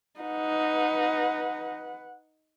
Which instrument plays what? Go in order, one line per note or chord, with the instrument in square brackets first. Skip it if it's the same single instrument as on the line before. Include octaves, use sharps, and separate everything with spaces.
[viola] D#4 [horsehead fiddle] B4 F#5